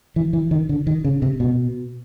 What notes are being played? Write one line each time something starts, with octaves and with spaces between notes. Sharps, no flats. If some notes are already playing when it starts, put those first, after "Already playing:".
E3
E3
D#3
D3
D#3
C#3
C3
B2